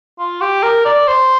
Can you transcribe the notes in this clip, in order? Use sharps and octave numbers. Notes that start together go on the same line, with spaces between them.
F4
G4
A#4
D5
C5